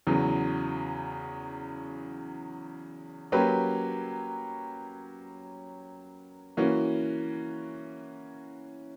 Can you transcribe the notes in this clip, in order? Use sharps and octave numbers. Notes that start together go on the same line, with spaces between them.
E2 C#3 F#3
F#3 A#3 C#4 G4 B4
E3 A#3 C#4 F#4